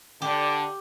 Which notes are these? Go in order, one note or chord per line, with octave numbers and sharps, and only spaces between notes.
D3 G4